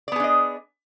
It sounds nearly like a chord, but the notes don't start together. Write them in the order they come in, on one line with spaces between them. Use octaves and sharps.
D5 B3 G#4 D4 D#5